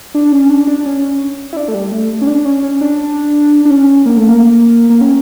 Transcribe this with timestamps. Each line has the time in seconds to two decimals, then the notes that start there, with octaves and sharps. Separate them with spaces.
0.14 D4
0.32 C#4
0.50 D4
0.67 D4
0.86 C#4
1.53 E4
1.57 D4
1.68 A3
1.74 G3
1.92 A3
2.21 C#4
2.27 D4
2.45 C#4
2.63 C#4
2.81 D4
3.65 D4
3.70 C#4
4.06 A#3
4.17 A3
4.29 A#3
4.90 A#3
5.01 C#4